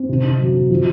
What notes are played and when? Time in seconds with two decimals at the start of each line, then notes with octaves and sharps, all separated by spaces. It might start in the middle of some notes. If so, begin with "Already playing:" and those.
Already playing: C4
0.09 C3
0.24 C3
0.39 F#3
0.55 F#3
0.70 F3